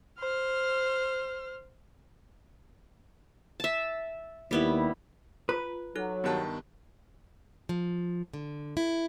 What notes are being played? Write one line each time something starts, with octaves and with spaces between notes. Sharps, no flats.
C5 F6
E5 A5
D#2 G3 B3 E4
F4 B4
F#3 D#4 A4 F#6
G2 D#3 B3 G4 A5 F#6
F3
D3
E4